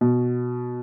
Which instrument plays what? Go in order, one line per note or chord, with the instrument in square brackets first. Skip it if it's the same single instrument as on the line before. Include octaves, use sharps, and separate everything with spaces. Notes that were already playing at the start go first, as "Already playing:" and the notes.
[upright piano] B2